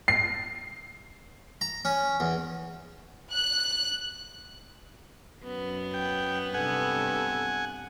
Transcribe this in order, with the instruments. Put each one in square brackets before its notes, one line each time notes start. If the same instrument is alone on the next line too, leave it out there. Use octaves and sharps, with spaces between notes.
[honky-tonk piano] C7
[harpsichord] A#5
C#4
E2
[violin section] F#6
[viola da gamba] F#2 [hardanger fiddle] B3
[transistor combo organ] G5
[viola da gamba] G2 C3 A4 [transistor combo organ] F#5 G#5